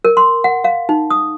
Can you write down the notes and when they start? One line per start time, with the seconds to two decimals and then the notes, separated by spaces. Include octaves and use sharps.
0.05 A#4
0.17 C6
0.44 F#5
0.64 F5
0.89 D#4
1.11 D#6